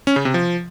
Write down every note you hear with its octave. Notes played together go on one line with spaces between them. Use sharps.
C#4
C#3
C3
F3